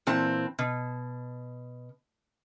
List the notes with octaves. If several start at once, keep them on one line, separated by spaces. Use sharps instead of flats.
A#2 E3 C4 A5
B2